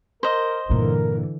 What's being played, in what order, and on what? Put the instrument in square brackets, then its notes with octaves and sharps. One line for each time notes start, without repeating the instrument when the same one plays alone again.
[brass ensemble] A#4 [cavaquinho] C5 D#5
[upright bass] G2 A#2 [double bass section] D3 E3 [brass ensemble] A#4